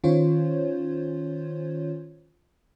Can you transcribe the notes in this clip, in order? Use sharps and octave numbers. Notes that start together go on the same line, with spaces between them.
D#3 C#4 F4 C5 C#5